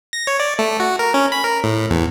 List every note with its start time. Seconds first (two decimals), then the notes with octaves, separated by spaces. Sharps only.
0.13 A#6
0.27 C#5
0.40 D5
0.59 A3
0.80 F#4
0.99 A#4
1.14 C#4
1.32 B5
1.44 A#4
1.64 A2
1.90 E2